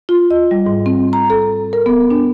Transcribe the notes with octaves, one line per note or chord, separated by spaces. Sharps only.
F4
D#5
G3
G#2
C4
A#5
A4
A#4
B3
D4